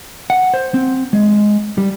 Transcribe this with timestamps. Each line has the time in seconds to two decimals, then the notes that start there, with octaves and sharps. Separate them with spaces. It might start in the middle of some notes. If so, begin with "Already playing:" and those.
0.30 F#5
0.54 C5
0.74 C4
1.13 G#3
1.78 G3